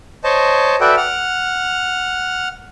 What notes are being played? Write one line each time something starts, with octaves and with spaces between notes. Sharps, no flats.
C5 C#5 D#5 A5
F#4 A4 B4 D5 E5 G5
F#5 F6